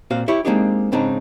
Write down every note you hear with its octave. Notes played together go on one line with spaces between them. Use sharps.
A#2 C4 F#4 C5 F5
E4 G4 C#5
G#3 A#3 C4 D4 D#4 G4
G#2 C#3 C4 D4 D#4